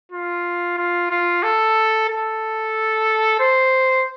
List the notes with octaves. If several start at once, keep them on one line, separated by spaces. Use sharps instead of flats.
F4
F4
F4
A4
A4
C5